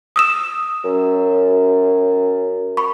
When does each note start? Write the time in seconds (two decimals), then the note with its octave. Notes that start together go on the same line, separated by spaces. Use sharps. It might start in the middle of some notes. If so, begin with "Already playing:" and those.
0.16 D#6 E6 E7
0.84 F#2
2.77 B5 C#6